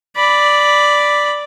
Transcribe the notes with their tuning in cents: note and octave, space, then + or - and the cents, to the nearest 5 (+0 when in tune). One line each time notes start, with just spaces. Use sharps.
D5 +0 B5 +0